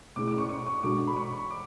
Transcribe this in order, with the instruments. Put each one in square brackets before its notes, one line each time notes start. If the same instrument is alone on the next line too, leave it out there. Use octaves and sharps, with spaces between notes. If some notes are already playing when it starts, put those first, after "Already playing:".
[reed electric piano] B2 A3 C#4 E4 G#4 [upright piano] D6
[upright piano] D6
C#6
C#6
C#6
[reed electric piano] B2 G#3 D4 F#4 A4 [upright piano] D6
[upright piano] B5
C#6
D6